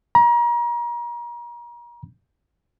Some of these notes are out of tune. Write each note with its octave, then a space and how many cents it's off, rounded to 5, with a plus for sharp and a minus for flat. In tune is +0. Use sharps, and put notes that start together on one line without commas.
A#5 +35